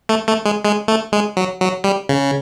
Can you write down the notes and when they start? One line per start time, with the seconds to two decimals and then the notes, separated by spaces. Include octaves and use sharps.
0.09 A3
0.28 A3
0.45 G#3
0.65 G#3
0.88 A3
1.12 G#3
1.37 F#3
1.61 F#3
1.84 G3
2.09 C#3